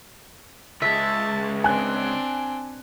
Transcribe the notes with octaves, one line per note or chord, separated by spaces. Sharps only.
C#2 G#3 E5 A5
C4 D4 G#5 F#6